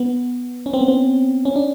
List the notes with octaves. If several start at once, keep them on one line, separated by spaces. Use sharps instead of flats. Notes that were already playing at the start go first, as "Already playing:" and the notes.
Already playing: B3
C#4
C4
B3
C4
C#4
D4